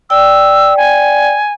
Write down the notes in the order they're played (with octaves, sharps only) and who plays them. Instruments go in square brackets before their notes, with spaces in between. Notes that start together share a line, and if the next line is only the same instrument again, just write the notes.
[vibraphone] D5 G5 [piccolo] E6
[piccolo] G#5